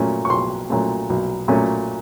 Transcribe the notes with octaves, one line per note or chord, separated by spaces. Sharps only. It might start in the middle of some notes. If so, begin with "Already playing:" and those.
Already playing: A#2 F#3 A3 C#4
C#6
B1 C6
A#2 F#3 A3 C#4
B1
A#2 F#3 A3 C#4